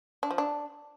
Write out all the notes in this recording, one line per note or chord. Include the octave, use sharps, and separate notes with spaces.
D4
F3
D4